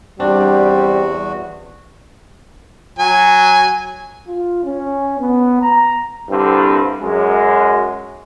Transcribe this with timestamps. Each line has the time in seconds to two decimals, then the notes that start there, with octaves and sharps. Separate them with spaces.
0.20 E2 G3 C4 D4 F#4
2.99 F#3 G#5
4.27 F4
4.64 C#4
5.19 B3
5.61 A#5
6.30 C2 G2 D3 C4
7.02 F#2 G#3